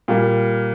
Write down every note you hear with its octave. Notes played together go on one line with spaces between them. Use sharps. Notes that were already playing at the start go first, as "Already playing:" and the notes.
A#2 G3 A#3